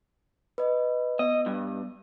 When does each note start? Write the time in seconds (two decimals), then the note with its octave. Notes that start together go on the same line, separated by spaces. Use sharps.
0.58 B4 D#5
1.19 B3 D#5
1.46 G2